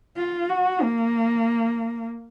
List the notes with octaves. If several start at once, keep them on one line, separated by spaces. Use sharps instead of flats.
F4
F#4
A#3